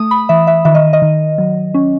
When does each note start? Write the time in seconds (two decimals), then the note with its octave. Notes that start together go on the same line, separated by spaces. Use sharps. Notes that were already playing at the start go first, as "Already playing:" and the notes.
Already playing: A3 D#6
0.11 B5
0.29 E3 E5
0.47 E5
0.65 D#3 E5
0.75 D#5
0.93 D#5
1.02 D#3
1.38 F#3
1.74 C#4